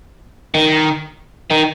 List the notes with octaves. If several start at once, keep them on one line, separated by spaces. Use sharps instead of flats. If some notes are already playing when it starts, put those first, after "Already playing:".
D#3
D#3